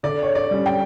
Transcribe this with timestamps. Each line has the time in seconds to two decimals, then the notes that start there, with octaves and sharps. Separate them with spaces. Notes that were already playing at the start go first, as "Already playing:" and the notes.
0.03 D3 D5
0.23 C#5
0.35 D5
0.51 G3 C#4
0.66 G5